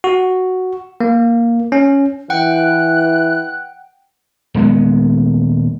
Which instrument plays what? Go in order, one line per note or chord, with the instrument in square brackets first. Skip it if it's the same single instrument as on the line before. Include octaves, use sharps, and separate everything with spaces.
[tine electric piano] F#4
A#3
C#4
[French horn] E3 [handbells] F#5 G5 [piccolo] F#6
[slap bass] D#1 G#3 B3